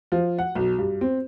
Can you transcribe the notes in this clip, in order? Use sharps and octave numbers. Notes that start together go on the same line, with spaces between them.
F3
F#5
B1
G2
C4